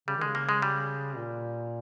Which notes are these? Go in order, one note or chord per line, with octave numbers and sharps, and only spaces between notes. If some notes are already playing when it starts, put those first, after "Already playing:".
C#3 G3
D#3
C#3 G#3
A#3
G#3
G3
A#2